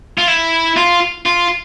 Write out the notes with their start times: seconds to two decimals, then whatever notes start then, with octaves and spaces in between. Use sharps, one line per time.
0.18 F4
0.28 E4
0.77 F4
1.26 F4